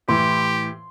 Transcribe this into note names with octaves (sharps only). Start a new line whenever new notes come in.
A2 E3 G4 C6